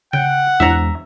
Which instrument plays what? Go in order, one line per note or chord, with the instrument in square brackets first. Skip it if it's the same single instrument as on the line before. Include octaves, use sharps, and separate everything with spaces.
[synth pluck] C#3 [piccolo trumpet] F#5 [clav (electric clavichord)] G5
[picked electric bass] E2 G#3 [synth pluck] D4 E4 C5 [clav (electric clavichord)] E5 A#5